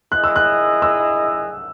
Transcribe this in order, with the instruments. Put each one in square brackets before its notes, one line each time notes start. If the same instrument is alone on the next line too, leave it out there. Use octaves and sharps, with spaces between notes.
[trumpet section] E4 G#4 D#5 [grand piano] F#6
[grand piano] E6
F#6
E6